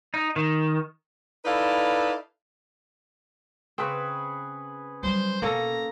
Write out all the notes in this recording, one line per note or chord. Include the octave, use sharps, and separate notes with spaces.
D#4
D#3
D#4 E4 A4 B4 D5 F5
C#3 C4 G#4 B4 C#6
F#3 G3 C5
B2 A#3 C#4 A4 A#5